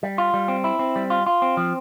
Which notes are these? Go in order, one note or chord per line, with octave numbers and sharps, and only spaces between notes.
G3
F4
G3
C4
E4
C4
G3
F4
F4
C4
F3